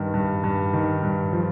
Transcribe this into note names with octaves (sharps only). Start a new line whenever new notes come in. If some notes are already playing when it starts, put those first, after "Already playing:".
Already playing: G2 D#3
G2
G2
D#3
G2
F3